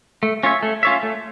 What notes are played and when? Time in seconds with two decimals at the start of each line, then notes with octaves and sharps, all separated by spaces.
0.23 A3
0.43 C#4 F4 C#5 E5
0.63 A3
0.83 C#4 F4 C#5 E5
1.03 A3